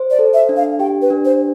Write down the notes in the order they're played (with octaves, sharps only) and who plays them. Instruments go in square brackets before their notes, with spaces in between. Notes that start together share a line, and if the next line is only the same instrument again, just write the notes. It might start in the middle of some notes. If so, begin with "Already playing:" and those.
Already playing: [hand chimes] C5
[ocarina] D5
[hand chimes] A4
[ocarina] E5
[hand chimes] D4
[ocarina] F5
[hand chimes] G4 [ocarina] G5
[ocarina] B4
[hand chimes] D4
[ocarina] C5